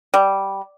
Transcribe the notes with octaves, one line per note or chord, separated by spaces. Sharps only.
G3